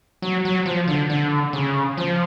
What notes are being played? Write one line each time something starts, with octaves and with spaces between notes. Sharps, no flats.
F#3
F#3
F3
D3
D3
C#3
F3